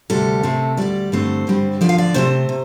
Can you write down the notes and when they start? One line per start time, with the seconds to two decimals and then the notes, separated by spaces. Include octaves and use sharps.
0.10 D2 C3 G3 A4
0.43 C3 A3 C4
0.77 D2 C3 G3 D5
1.12 G2 D3 A3 C4 C5
1.47 G2 D3 G3 C4
1.81 D2 D3 F3 D5
1.89 F5
1.98 D5
2.14 C3 A3 C4 C5
2.49 C3